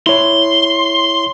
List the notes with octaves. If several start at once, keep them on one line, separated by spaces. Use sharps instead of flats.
E4 C#5 C6